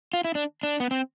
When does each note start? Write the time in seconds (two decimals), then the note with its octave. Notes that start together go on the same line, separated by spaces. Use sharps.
0.13 F4
0.24 E4
0.35 D4
0.63 D4
0.80 B3
0.91 C4